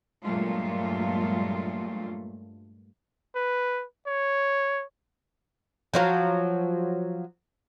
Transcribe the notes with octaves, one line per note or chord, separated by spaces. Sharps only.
G2 A#2 F#3 G#3 A3 F4
B4
C#5
F3 F#3 F4